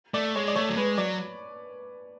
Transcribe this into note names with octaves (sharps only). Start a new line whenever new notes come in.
A3 D5
G#3 C#5
D5
A3 C#5
F#3
G#3 B4
F#3 D5